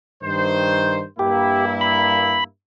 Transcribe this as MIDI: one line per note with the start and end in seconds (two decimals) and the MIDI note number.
0.24 1.03 43
0.24 1.03 51
0.24 1.03 72
1.19 2.43 43
1.19 2.43 58
1.19 2.43 64
1.19 1.65 67
1.81 2.44 83